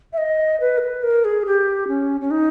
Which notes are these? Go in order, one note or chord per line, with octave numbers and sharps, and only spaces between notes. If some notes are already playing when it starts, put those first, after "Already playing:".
E5
D#5
B4
A#4
B4
A#4
G#4
G4
C#4
C#4
D#4